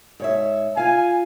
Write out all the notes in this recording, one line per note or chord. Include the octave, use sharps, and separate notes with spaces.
G#2 C#5 E5
F4 F5 G#5